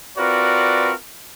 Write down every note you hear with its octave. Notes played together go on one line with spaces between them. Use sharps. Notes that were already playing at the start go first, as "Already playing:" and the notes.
C4 F4 F#4 A#4 B4 D5